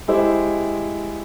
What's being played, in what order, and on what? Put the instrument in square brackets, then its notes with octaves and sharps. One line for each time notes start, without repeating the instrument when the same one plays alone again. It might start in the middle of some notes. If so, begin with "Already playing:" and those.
[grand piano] G#3 E4 G4 C5